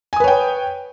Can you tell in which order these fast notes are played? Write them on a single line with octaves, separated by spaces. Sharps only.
G#5 D#6 B4 C#5 G5